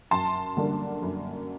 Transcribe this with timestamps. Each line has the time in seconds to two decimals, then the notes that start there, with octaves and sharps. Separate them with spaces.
0.11 F#2 A5 C6
0.57 D3 G3 A#3 D4
1.02 F#2